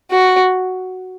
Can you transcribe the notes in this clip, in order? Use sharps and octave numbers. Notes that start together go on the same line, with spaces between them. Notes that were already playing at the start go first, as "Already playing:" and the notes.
F#4